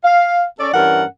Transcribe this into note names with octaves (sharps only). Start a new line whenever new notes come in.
F5
C#4 A4 D5
G2 E3 C#4 A#4 F#5